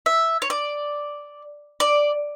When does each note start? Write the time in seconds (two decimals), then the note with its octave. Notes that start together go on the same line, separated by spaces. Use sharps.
0.06 E5
0.42 C#5
0.50 D5
1.80 D5